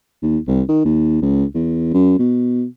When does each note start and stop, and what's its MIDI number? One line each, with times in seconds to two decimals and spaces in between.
0.22 0.38 39
0.47 0.62 36
0.69 0.83 51
0.85 1.21 39
1.22 1.44 37
1.54 1.93 40
1.94 2.18 42
2.19 2.64 47